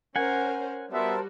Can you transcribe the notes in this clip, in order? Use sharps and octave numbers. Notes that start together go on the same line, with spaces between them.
C#4 A#4 C5 F#5 G#5
G3 B3 F#4 A#4 C5 E5 A5